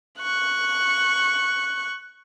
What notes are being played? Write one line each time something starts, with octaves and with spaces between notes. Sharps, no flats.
C#6 F#6